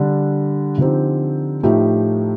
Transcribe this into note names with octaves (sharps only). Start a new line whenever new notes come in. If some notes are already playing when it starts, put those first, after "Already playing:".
Already playing: D3 G3 D4
D3 F3 C4 D#4 G4
A2 F3 A3 D#4 G4